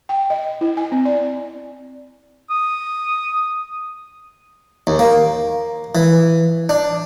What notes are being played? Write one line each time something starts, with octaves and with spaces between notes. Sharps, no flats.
G5
D#5
E4
G#5
C4
D5
D#6
D#2
A#3
E3
D4